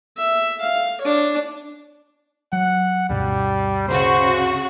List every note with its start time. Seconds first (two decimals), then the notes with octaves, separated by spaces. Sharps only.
0.17 E5
0.61 F5
1.01 D4 C#5
2.53 F#3 F#5
3.10 D2 G2 B2 G3
3.88 C#3 F#4 C5